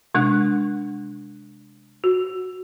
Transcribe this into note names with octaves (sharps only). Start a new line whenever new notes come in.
C3 G#3 D4 F#6
F#4